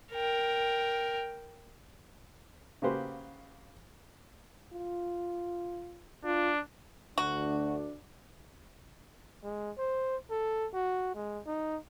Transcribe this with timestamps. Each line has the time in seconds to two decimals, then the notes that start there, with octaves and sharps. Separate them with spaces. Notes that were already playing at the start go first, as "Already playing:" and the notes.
0.12 A#4 G5
2.82 C#3 A#3 F#4 G4 B4 C5
4.73 F4
6.24 D4 F4
7.18 D2 D4 F#4
9.43 G#3
9.78 C5
10.31 A4
10.74 F#4
11.15 G#3
11.46 D#4